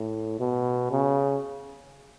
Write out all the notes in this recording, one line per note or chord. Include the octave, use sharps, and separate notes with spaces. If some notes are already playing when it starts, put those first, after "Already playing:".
Already playing: A2
B2
C#3